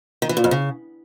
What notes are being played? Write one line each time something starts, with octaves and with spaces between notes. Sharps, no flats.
D#3
E3
A#2
F2
C#3